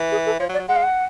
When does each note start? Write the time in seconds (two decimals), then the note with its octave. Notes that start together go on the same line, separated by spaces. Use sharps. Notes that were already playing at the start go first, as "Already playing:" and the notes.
Already playing: E3
0.12 G#4
0.26 A4
0.39 F3 C#5
0.49 F#3
0.54 D5
0.59 F#3
0.68 G#3 F#5
0.76 F5
0.83 F#5